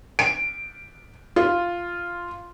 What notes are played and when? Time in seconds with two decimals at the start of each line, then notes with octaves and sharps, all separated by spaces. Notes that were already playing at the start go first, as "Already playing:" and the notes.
0.19 D7
1.36 F4